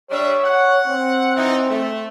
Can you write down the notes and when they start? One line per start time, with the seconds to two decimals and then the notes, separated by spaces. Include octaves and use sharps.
0.11 G3 D4 C#5 E5
0.44 F#5
0.88 C4
1.36 E3 D#4
1.70 A3